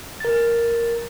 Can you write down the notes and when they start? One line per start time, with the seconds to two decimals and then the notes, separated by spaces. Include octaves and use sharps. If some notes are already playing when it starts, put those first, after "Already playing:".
0.20 A#4 A6